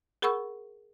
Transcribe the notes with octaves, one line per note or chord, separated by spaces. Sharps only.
G#4 A#4 F#5 B5 C#6 E6